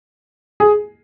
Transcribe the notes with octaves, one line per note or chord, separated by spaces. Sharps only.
G#4